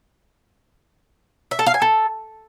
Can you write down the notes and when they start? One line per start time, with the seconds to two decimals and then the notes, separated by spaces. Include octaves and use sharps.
1.51 E5
1.59 A4
1.66 F5
1.74 G#5
1.82 A4